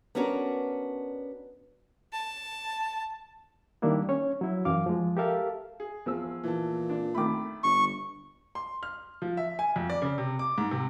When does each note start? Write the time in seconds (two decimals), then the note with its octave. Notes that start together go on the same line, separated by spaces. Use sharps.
0.15 B3 C#4 D4 F#4 A#4
2.13 A5
3.82 D#3 G3 A#3 D4 E4
4.09 C#4 C#5
4.41 F#3 E4
4.65 F#2 E3 F5 D6
4.86 F3 G#3
5.17 G4 A4 A#4 E5 F5 A5
5.80 G#4
6.06 E2 F3 E6
6.44 A#2 E3 A5
6.89 D4
7.15 D#3 A3 B5 D6
7.64 G1 C#6
8.55 C6
8.83 F6
9.22 F3
9.37 E5
9.59 G#5
9.76 F2
9.90 D5
10.02 C#3
10.18 C3
10.39 D6
10.58 G#2
10.71 C3